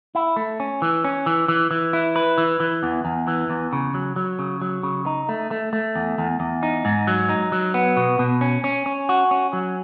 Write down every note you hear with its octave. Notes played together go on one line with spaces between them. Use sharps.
E4
A3
C#4
E3
C#4
E3
E3
E3
E4
B4
E3
E3
E2
E2
E3
E2
C#3
F#3
F#3
C#3
F#3
C#3
D#4
A3
A3
A3
E2
E2
E2
D#4
G#2
F#3
D#4
F#3
B3
B2
B2
C#4
C#4
C#4
F#4
C#4
F#3